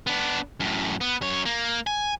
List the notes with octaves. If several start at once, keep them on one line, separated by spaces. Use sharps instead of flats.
B3 D4
F#2 A2
B3
F#2 C#5
A#3
G#5